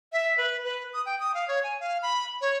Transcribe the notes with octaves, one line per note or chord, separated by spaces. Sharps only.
E5
B4
B4
D#6
G5
D#6
F5
C#5
G#5
F5
B5
C#5